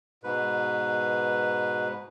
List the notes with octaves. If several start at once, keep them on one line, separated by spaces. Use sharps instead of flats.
G#2 B2 B4